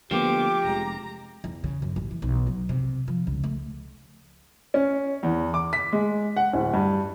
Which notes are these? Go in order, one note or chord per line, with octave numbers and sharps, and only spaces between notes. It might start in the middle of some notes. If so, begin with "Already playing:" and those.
D2 F3 A#3 B3 G4 D6
F1 G#3 A#5
E2
C#3
F#2
A1
E3
B1
F#3
C3
F3
C#2
A3
C#4
E2
D6
B6
G#3
F#5
D1
G2